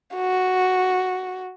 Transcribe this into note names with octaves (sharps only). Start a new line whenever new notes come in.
F#4